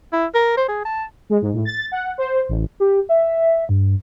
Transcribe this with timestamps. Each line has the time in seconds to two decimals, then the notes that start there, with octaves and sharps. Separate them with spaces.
0.13 E4
0.34 A#4
0.57 C5
0.68 G#4
0.85 A5
1.30 G#3
1.42 G#2
1.53 A2
1.65 A6
1.92 F#5
2.18 C5
2.49 A1
2.80 G4
3.09 E5
3.69 G2